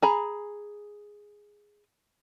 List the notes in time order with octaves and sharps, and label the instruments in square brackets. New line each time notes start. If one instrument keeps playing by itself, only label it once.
[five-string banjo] G#4 A#5 B5